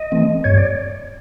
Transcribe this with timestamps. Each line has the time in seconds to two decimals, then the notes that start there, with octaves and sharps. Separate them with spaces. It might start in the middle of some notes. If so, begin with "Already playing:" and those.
Already playing: D#5
0.12 E3 A3 C4
0.44 G2 C#5
0.58 D5